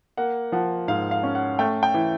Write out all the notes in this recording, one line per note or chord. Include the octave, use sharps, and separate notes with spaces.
A#3 F#5
F3 F#5
G#2 F5
F5
C#4
F#5
A3 G5
G5
E3